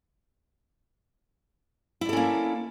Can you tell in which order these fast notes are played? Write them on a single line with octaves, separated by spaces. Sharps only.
E4 D5 A4 C#4 A#3